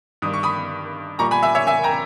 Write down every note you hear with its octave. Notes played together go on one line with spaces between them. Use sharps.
G2 D#3 G3 D#6
C#6
B5 D#6
A#2 G3 A#5 C#6
G#5 B5
E5 G#5
C#5 E5
E5 G#5
G5 A#5